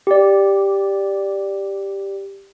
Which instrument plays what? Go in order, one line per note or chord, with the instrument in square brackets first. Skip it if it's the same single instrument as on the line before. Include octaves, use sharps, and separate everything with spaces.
[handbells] G4 D5